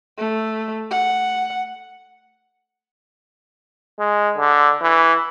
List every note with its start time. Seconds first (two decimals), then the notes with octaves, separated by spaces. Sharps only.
0.18 A3
0.91 F#5
4.00 G#3
4.37 D3
4.82 E3